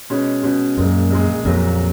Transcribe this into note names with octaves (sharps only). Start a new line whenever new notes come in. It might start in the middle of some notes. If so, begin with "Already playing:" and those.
B2 G#3 C#4
B2 G#3 C#4
A#1 F#2 A#2 G#3
A#1 A#2 G#3
A#1 F2 A#2 F#3